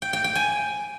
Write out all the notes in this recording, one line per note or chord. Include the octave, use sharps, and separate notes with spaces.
G5
G5
G5
G#5